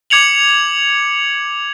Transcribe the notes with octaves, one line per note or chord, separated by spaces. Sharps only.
D6 G#6 C#7 F7 F#7